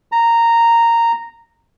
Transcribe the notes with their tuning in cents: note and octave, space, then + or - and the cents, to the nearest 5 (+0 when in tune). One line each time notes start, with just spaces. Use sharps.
A#5 -10